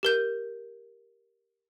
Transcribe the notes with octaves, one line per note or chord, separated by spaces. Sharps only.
G4 A#4 G6